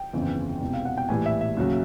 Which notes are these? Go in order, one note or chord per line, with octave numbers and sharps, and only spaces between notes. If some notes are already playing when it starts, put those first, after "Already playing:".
Already playing: G5
G1 F2 C#3 E3
E1 E2 C3
F5
F#5
G5
A#1 A2 E3 G3 G#5
E5
E5
D#2 C#3 F#3